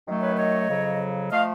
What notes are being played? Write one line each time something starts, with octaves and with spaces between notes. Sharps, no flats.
F#2 D#3 F#3 A3
B4 C#5
C#5 D#5
F2 C#3 F#3
F3 A3 D#5 F5